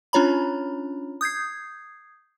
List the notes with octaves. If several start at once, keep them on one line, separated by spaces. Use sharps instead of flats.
C#4 D4 F4 C#5 A#5 B5
D#6 G6 G#6 C7